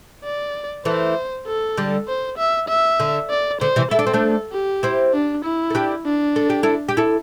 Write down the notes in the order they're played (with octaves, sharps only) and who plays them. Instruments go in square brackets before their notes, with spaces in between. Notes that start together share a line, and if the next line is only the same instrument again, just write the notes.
[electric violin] D5
[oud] E3 A3 [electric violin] C5
[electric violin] A4
[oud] D3 G3
[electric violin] C5
E5
E5
[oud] D3
[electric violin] D5
[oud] D3 [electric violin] C5
[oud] C3 E3
[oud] E4 [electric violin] A4
[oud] D4
C4
A3 D4
[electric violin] G4
[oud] C4 E4
[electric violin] D4
E4
[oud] A4
D4 G4
[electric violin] D4
[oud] A4
G4
E4 A4
G4
E4 A4